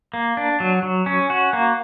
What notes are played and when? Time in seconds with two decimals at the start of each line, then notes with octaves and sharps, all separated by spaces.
0.14 A#3
0.37 D4
0.60 F#3
0.83 F#3
1.06 C#4
1.30 F#4
1.53 A#3